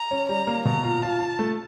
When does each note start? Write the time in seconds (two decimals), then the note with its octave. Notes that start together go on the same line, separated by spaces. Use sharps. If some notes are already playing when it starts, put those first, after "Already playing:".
Already playing: A#5
0.11 C#4
0.29 G3 A#5
0.47 A#3
0.65 B2 A#5
0.83 F4
1.02 F4 A5
1.20 F4
1.39 A3